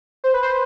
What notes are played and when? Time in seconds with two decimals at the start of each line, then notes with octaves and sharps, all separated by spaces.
0.24 C5
0.34 B4
0.43 C5